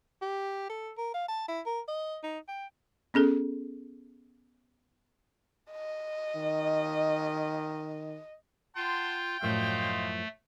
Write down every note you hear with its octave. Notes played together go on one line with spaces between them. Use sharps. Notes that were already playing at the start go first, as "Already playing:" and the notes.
G4
A4
A#4
F5
A5
E4
A#4
D#5
D#4
G5
B3 C#4 G#4 A4
D#5
D#3
F4 F#5 G5 A5 C6
F#2 A2 F3 A3 D#5 F5 C6